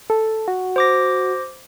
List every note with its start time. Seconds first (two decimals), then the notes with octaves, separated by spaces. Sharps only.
0.10 A4
0.48 F#4
0.76 C5 D6 A#6